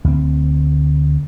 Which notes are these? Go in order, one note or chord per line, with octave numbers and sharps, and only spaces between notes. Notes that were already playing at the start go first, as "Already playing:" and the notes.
D2 C4